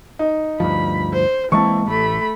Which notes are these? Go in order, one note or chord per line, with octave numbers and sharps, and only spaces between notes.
D#4
D2 G2 F3 B5
C5
E3 G#3 A#3 C4 E4 A5 C#6
A1 A3 B5